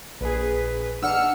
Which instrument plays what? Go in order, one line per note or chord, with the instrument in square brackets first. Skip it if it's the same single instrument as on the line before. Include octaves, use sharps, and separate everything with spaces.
[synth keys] A#1 G#4 [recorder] B4
[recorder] D4 [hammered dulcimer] F#5 [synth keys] E6 F6 C#7